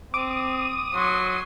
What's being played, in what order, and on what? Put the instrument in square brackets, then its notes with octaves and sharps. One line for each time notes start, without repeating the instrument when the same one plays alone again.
[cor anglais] C4 [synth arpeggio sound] D6 [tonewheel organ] D#6
[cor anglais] F#3 [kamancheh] C6